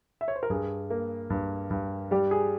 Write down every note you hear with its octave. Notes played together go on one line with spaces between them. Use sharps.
E5
C#5
C5
A#4
G2 G#4
A#3
G2
G2
G3 G4
G#4